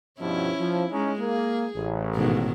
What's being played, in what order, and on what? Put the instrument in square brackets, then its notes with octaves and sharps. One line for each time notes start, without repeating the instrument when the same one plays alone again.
[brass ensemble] G2 B2 F3 [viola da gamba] C#4 E4
[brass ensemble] F3
[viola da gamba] G#3 [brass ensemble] C#4 D#4
[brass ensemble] A#3 [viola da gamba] G#4
[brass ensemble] A1
[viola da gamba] G#2 B2 D#3